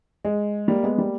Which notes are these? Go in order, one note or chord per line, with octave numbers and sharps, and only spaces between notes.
G#3
G3 A#3
G#3 B3
G3 A#3